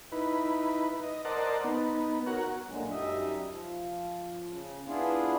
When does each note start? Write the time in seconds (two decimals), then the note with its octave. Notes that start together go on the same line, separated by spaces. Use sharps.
0.12 D#4 E4 B4
1.03 D#5
1.25 A#4 C5 D5 D#5 F#5 A5
1.64 B3 D#4
2.27 F#4 A#4 C#5 F#5
2.67 A#2 D3 F#3 G#3
2.90 F#2 G3 D#4 D#5 E5
3.48 F3
4.48 C#3
4.87 B3 D4 E4 F4 G#4